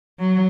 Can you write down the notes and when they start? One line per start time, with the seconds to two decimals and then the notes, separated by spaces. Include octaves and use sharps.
0.19 F#3